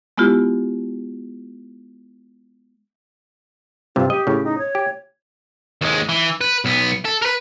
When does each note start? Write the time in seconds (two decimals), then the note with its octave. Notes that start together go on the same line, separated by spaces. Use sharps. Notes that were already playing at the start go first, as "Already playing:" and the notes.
0.18 G#3 B3 E4 F4 G4
3.96 G2 C3 F4
4.10 G4 D#5
4.27 A2 C#3
4.45 D#4
4.58 C#5
4.75 G4
5.82 D#2 G#3
6.09 E3
6.41 B4
6.65 B1 B3
7.05 A4
7.22 A#4 B4